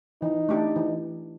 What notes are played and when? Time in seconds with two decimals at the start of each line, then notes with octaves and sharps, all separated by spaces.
0.22 E3 D#4
0.49 A3 D4 G4
0.76 E3